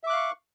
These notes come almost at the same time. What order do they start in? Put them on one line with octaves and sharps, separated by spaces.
E5 D6 F#6 F5 C#6